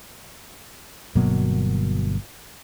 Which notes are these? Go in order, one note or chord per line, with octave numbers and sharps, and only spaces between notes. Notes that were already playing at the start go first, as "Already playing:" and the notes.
G1 B2 F#3 A#3